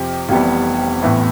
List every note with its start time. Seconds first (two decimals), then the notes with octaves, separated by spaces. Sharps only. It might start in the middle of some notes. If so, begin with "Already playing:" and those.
Already playing: F2 C3 F3 C4 G4
0.29 F1 F2 E3 G3 B3
1.02 A1 A2 E3 B3